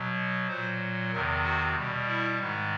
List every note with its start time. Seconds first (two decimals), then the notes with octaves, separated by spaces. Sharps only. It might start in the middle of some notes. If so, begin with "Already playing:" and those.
Already playing: B2 F#3
0.48 A#2 F#3 C5
1.11 E2 C3 D#3 A#4
1.43 F#4
1.75 B2 G3
2.07 E4
2.39 G#2 D#3 G#3